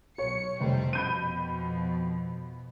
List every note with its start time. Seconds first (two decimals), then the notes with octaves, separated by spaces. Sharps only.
0.18 B1 C#5 C#7
0.61 F1 G3 A3 C4
0.93 F2 B2 B5 G6 D#7